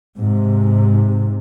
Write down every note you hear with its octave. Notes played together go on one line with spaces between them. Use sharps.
G#2 C3